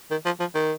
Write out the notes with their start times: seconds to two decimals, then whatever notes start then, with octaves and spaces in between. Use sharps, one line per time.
0.11 D#3
0.26 F3
0.40 F3
0.55 D#3